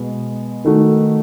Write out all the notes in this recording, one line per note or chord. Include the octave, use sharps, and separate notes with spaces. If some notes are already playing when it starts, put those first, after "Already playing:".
Already playing: B2 G#3 B3
D#3 A3 D#4 F#4